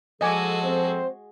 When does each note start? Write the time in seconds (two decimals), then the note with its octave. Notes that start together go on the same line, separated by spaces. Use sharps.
0.21 F3 G#3 F#4 A4 D#5 G#5 D6
0.62 C4 C5